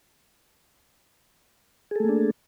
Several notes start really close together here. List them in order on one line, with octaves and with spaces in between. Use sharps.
G#4 A4 A3 A#3 D4